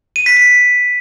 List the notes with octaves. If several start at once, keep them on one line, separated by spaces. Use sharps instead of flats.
D#7
B6
B6